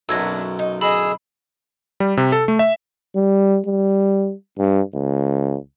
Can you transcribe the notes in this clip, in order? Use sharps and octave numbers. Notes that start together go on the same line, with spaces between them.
B1 F#2 A#3 B3 D4 E6 G#6 A#6
D#4
D3 E4 G#4 D#5 B5 E6
G3
C3
A4
A3
E5
G3
G3
G2
C#2